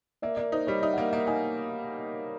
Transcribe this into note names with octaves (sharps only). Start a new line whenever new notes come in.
A#3 D5 E5
A#3 D5 E5
D#4 C5 D5
G3 C#5 D#5
D#4 D5 E5
F#5
A#3 D#5 F5
A#3 E5 F#5
D#4 F#5 G#5